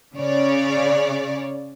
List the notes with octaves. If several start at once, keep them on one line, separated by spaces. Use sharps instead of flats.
C#3 C#5 D5